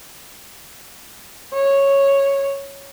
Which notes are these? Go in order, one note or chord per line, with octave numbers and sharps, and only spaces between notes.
C#5